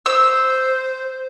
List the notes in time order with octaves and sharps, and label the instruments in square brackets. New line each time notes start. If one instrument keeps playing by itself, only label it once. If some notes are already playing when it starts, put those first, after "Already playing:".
[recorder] C5 [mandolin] E6